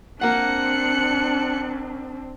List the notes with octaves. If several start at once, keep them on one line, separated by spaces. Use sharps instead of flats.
A#3 C4 D4 F#5 F#6 C#7